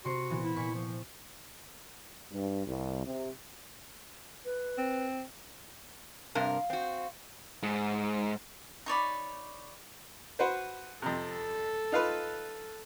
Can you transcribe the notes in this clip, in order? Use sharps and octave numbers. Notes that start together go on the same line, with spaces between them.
C3 F#4 C6 C#7
A#2 E3 B3
E4
A#2 C#6 B6
F3
G2
C2
C3
B4
C4
G2 C3 A#4 F5
C4 F#4
G#2
D#4 C#5 D5 B5
F#4 B4 C5
F2 C3 A4
D#4 F4 B4